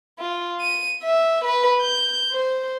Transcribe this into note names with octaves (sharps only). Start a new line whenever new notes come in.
F4
D#7
E5
B4
G6
C5